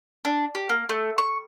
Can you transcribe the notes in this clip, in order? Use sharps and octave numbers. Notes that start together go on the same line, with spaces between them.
D4
G4
A#3
A3
C#6